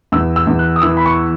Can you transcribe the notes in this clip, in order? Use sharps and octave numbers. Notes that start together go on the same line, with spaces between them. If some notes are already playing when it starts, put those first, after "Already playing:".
E2 E6
E6
E2
F#6
D#6
E3 E6
B5
C#6